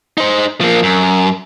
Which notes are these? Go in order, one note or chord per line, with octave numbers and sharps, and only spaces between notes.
D#4 C5
F3 A#3
F#2